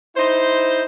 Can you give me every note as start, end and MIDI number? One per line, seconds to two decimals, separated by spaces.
0.15 0.83 63
0.15 0.83 64
0.15 0.83 72